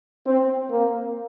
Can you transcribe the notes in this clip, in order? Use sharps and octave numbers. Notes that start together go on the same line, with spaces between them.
C4
A#3